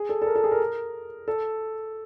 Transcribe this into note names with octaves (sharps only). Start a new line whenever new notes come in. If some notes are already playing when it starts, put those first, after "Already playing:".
Already playing: G#4
A4
A4
A#4
A4
G#4
A#4
A4